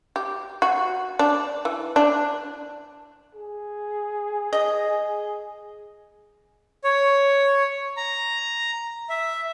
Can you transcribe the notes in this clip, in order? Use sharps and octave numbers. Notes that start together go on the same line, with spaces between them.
G4
F#4
D4
E3
D4
G#4
D#5
C#5
A#5
E5